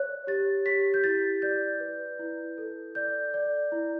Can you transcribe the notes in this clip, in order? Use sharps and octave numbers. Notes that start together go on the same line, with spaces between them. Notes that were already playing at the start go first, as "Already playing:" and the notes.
Already playing: C#5 F#6
G4 A6
G4 B6
G6
E4 A6
D5 G6
B4
E4
A4
D5 G6
D5
E4